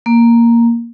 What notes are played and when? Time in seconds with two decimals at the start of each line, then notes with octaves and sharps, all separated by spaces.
0.06 A#3